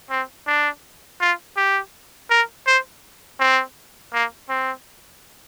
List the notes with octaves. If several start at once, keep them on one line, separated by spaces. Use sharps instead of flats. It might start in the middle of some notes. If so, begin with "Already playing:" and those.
C4
D4
F4
G4
A#4
C5
C4
A#3
C4